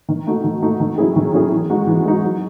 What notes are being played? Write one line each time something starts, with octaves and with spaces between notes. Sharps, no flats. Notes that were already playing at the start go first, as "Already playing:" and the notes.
D#3
A3 D#4 F#4
D#3
A3 D#4 F#4
D#3
F#3 C#4 E4 G#4
D#3
F#3 C#4 E4 G#4
E3
G#3 D#4 F#4
E3
G#3 D#4 F#4
F#3